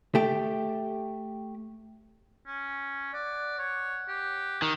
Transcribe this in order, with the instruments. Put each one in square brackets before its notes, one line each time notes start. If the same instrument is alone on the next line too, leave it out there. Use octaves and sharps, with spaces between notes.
[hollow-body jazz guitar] A3 G4
[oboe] C#4
[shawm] D5 [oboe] F#5
[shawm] C#5
G4
[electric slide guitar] D#3